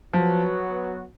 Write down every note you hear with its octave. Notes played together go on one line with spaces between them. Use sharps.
F3 F#3 B3 F#4